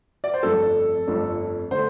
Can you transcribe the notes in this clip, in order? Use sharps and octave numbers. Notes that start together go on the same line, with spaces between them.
D5
C5
G1 F2 F3 A3 D4 A4
G1 F2 F3 A3 D4
D3 A3 C5